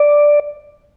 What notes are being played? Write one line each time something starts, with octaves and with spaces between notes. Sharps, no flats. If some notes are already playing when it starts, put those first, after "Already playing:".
Already playing: D5